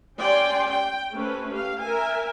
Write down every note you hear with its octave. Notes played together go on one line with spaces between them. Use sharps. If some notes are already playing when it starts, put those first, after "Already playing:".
C#4 G4 D5 G5 G#5 C6
G5
A3 C#4 G4 B4 C5
G4 F5
A#4 E5 G#5